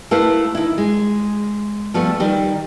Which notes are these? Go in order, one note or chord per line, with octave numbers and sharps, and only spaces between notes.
A3 E4 A#4 B4 F5
D#3 E4
G#3
F3 G3 A3 B3
D#3 G3